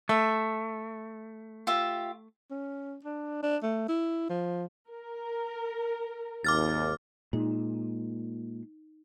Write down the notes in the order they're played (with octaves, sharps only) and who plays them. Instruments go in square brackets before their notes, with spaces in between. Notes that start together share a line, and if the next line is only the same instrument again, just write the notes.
[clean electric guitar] A3 [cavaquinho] E5
[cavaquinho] F4 G4 E5
[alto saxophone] C#4
D4
D4
A3
E4
F3
[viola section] A#4
[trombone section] G#1 D#2 [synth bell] D6 F6 A6
[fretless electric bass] A#2 G#3 [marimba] D#4